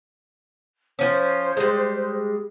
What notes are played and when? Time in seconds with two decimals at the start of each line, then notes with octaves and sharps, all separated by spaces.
0.99 F3 C#4 C5
1.57 G3 G#3